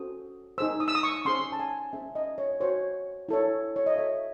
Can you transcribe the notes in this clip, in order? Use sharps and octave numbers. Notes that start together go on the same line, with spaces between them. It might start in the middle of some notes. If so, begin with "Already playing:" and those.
Already playing: C#4 F#4 A4 C5 D#6
D#4 G#4 C5 E6
D#6
E6
D#6
C#6
C#4 G#4 C5 C6
A5
G#5
C#4 G#4 C5 E5
D#5
C#5
F#4 C5 C#5
E4 A4 C#5
C#5
D#5
F#4 A4 C#5 E5